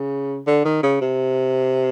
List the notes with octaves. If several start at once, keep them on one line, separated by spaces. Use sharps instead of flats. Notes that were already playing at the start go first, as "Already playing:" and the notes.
Already playing: C#3
D3
D#3
C#3
C3